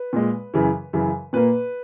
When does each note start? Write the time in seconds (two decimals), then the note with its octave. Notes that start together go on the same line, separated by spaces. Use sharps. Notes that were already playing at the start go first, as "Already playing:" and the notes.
Already playing: B4
0.13 A#2 G#3
0.54 F#2 C#3 E3
0.93 F#2 C#3 E3
1.33 A#2 A#3 B4